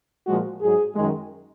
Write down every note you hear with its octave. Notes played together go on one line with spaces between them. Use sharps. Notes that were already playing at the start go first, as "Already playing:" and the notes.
A#2 F3 G#3 F#4
G#2 F#3 G#4
F#2 D#3 G#3